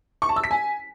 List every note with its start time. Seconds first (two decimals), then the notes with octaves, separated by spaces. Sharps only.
0.22 C#6
0.29 A5
0.36 E6
0.44 B6
0.51 G#5